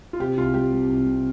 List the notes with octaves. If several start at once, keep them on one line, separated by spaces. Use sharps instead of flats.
F4
C3 G4
C2 F4
G3 G4
G3
C2
C2